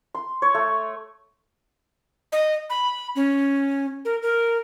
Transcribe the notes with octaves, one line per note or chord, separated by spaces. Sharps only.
C6
C#5
A3
D#5
B5
C#4
A#4
A#4